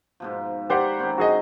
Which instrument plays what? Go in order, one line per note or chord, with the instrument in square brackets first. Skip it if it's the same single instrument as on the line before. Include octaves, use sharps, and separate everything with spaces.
[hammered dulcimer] G#2 B2 F3
[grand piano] G4 C5 F#5 [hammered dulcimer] B4 D5 A#5
[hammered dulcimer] D#3 C4 C#4
[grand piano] F#4 G#4 D#5